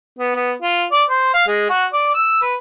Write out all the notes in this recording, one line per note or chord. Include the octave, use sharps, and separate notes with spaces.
B3
B3
F4
D5
C5
F5
G#3
F#4
D5
E6
B4